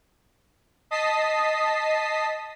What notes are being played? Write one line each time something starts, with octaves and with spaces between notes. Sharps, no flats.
D#5 A5 D#6 B6 C7